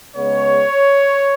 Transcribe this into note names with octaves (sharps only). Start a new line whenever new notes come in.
C#3 G#3 B3 C#5